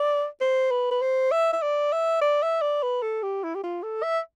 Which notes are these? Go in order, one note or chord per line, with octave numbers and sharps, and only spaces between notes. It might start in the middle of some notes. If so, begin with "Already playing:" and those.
Already playing: D5
C5
B4
B4
C5
E5
E5
D5
E5
D5
E5
D5
B4
A4
G4
E4
G4
F4
A4
E5